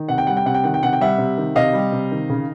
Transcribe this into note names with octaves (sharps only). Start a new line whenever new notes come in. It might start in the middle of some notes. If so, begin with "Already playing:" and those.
Already playing: D#3
C3 F#5
G5
G3 F#5
G5
C3 F#5
G5
D#3 F#5
G5
C3 F#5
G5
G3 E5 F#5
C3
D#3
C3 D#5 F5
G3
C3
D#3
C#3